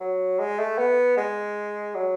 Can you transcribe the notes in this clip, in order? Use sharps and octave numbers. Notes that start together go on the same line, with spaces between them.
F#3
G#3
A3
B3
G#3
F#3